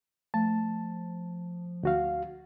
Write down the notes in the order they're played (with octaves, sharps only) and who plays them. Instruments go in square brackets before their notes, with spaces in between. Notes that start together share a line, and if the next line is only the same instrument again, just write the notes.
[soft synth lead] F3 [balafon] A3 [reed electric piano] A5
[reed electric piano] D2 F#4 F5